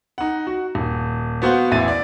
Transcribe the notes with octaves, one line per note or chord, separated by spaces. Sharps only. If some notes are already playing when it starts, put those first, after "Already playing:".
D#4 F#5
F#4
D#1
B3 F#4 C5 F5 F#5
A1 E2 E4 F5 A6 D#7
D5